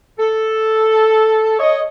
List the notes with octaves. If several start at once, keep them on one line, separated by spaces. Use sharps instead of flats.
A4
C#5 D#5